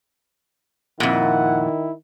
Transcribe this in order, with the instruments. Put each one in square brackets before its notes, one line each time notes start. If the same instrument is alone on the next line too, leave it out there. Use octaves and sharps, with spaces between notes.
[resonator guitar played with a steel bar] F2 A#2 [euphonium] D#3 [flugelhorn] E4 [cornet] F#5